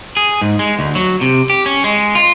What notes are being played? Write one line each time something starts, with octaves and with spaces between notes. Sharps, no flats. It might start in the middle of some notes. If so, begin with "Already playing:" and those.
G#4
G#2
G#3
D2
F#3
C3
G4
C#4
G#3
F4